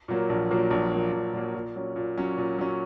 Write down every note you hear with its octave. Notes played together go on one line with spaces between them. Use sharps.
A#2 F#3 A#3
A#1
A#2 F#3 A#3
A#1
A#2 F#3 A#3
A#1
A#2 F#3 A#3
A#2
F#3 C#4
A#2
F#3 C#4
A#2
F#3 C#4